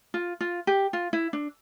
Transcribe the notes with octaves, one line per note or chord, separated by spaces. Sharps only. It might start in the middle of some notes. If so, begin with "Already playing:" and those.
F4
F4
G4
F4
E4
D4